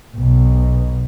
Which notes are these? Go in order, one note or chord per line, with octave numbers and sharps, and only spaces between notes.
B1 B2